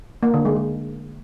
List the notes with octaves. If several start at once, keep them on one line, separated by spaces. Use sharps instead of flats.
A#3
D3
G#3
G#3